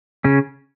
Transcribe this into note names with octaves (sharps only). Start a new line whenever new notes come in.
C#3 C#4